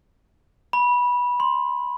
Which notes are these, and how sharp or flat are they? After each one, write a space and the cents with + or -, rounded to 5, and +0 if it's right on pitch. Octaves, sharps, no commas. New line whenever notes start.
B5 -15
C6 +5